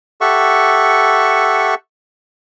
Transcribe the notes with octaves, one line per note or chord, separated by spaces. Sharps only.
G4 A4 E5 F#5 C#6